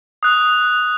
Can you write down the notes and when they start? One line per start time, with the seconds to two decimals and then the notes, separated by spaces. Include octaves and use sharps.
0.23 D#6 F#6